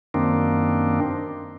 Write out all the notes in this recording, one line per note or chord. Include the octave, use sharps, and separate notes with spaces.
F#2 D#3 A#3 C4 D4